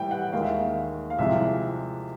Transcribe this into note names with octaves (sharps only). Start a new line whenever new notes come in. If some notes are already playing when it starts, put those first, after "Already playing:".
Already playing: A2 E3 G3 G5
F#5
D#2 D#3 G#3 F5
E5
F5
F5
C2 C3 F3 G#3 E5